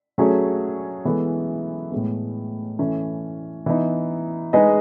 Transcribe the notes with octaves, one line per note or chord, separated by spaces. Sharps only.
F#3 A3 C#4 G#4 C#5
E3 G#3 B3 E4 A4
A2 G#3 B3
E3 A3 C#4
E3 B3 D#4
G#3 D#4 G#4 B4 D#5